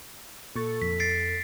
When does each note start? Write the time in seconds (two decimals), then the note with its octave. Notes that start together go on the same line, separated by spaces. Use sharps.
0.56 A#2 A4 C#6 A6
0.82 F2 B6
1.00 A6 C7 D7